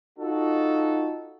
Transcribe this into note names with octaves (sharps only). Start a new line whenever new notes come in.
D#4 F4 F#4 A4